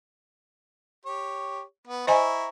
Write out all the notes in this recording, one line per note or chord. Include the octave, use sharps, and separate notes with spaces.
G4 C#5
B3
E4 C5 D#5 G#5 A#5 C#6